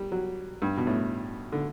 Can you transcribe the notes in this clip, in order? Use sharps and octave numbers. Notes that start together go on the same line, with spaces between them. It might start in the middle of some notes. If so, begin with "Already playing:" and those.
Already playing: G3
F#3
G2
B2
A2
D3